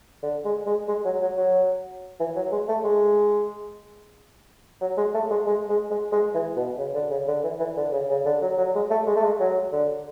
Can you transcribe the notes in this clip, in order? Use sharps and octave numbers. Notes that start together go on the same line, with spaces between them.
D3
G#3
G#3
G#3
F#3
F#3
F#3
E3
F#3
G#3
A3
G#3
F#3
G#3
A3
G#3
G#3
G#3
G#3
G#3
E3
B2
C#3
D3
C#3
D3
E3
E3
D3
C#3
C#3
D3
F#3
F#3
G#3
A3
G#3
A3
G#3
F#3
D3